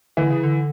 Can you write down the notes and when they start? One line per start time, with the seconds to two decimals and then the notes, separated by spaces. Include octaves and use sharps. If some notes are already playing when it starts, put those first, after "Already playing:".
0.17 D3 E3
0.31 C#3
0.43 D3